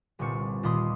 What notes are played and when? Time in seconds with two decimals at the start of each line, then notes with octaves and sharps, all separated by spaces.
0.19 G1 C2 A#2 C4 C#6 C#7
0.63 D#2 A#2 D#3 B5 C6 D#6